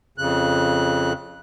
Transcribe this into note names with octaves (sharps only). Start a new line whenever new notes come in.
F2 C#3 F#6